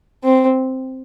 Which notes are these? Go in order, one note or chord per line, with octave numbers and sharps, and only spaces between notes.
C4